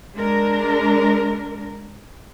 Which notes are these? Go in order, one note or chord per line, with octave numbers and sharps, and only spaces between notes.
G#3 D4 A#4